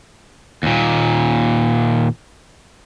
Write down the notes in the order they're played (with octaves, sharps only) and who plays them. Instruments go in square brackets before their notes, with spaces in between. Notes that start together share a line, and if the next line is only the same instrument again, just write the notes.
[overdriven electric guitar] D#2 A#2